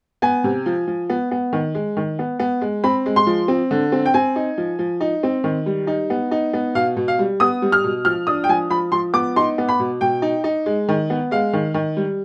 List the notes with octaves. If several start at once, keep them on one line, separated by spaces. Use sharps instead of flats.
B3 G#5
C3
F3
F3
B3
B3
D#3
G#3
D#3
B3
B3
G#3
C4 B5
G#3
C6
F3
C4
D3
C4
G5
C4 G#5
D#4
F3
F3
D#4
C4
D#3
G3
D#4
B3
D#4
B3
B2 F5
B2
F5
G3
B3 D#6
G3
F6
B2
F3 F6
D4 D#6
G5
F3 G#5
F3 B5
F3 C6
B3 D6
D#4 C6
B3
B5
B2
B2 G5
D#4
D#4
G#3
D#3
B3
G#3 F5
D#3
D#3
G3